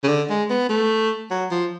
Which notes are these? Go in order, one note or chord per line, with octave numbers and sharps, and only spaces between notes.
C#3
D3
G#3
B3
A3
F#3
F3